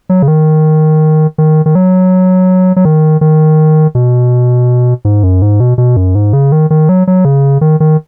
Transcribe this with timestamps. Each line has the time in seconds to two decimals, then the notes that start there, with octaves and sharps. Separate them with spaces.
0.09 F#3
0.23 C#3
0.28 D#3
1.38 D#3
1.66 D#3
1.75 F#3
2.76 F#3
2.85 D#3
3.21 D#3
3.95 B2
5.05 G#2
5.23 F#2
5.42 G#2
5.60 B2
5.78 B2
5.97 F#2
6.15 G#2
6.33 C#3
6.52 D#3
6.70 D#3
6.89 F#3
7.07 F#3
7.25 C#3
7.61 D#3
7.80 D#3